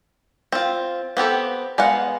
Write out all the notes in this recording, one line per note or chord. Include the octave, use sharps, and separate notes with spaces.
C4 F4
B3 C4 G4 A4
G#3 B3 F5 F#5